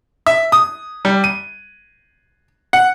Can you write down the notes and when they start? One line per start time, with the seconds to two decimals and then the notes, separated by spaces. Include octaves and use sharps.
0.26 E5
0.52 D#6
1.05 G3
1.24 D#7
2.73 F#5